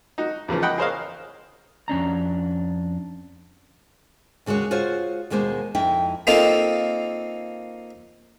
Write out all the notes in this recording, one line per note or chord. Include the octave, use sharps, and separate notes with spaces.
D#4 F#4
E2 C#3 E3 F3
D#5 F#5 G5 B5
G#4 A#4 C5 C#5 D#5 F5
F2 C#4 D4 A#5
D#2 C#3 G#3 F#4 C#5
F4 F#4 G#4 C5 C#5
D#2 B2 G#3 A#3 C5
F2 D#4 E4 G5
A#3 C4 D#4 F4 A4